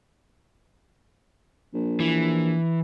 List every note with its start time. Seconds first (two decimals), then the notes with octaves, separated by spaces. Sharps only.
1.73 A#1
2.00 E3